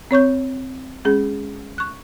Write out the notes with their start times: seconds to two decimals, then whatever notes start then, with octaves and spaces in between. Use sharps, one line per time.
0.11 C4 C#5 C#6 G6
1.05 G#3 C#4 G#4
1.78 C#6 F#6